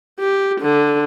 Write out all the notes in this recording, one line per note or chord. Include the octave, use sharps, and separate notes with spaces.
G4
D3